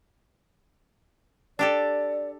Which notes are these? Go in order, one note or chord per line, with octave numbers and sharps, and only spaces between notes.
D4 G4 A4 D5